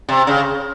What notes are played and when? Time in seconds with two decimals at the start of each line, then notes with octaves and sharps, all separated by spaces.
0.09 C3
0.27 C#3